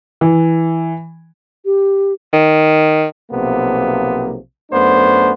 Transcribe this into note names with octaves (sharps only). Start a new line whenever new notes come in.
E3
G4
D#3
B1 C3 F3 A#3 B3
F#2 A3 B3 D4 C5